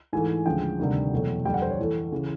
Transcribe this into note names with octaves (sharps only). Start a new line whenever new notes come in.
G#2 E3 A3 G#5
D2 C#3 F3 G#3 G5
D2 C3 D#3 G3
E2 B2 F#3 A3
F2 D3 G3 G5
F#5
C5
C#5
A2 E3 A3
C#3 E3